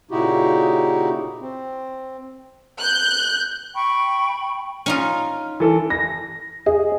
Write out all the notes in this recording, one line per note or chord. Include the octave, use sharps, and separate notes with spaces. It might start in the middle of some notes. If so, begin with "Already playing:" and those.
A#2 C#3 D#4 E4 F#4 G4
C4
F#6 G6
G5 B5 C#6
C#4 D#4 F4
E3 A4
A#6
G#4 D#5